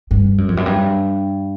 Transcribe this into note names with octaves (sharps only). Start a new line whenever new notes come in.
G2
F#2
F2
F#2
G2